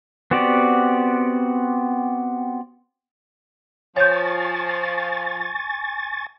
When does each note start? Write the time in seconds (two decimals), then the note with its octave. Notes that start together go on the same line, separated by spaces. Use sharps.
0.31 B3 C4 F#4 G4 D5
3.96 F3 C#5 G#5 C#6 G6 A6